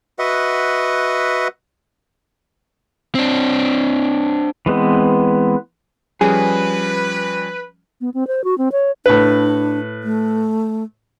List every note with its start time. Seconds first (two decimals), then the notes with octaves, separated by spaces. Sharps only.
0.19 F#4 B4 D#5 E5 F#5
3.15 C4 D4
4.66 E3 G#3 B3 C4
6.21 F3 G3 C#4 G#4 B4
8.01 B3
8.14 C4
8.27 C5
8.44 F#4
8.58 C4
8.72 C#5
9.06 A2 D4 B4
10.03 A3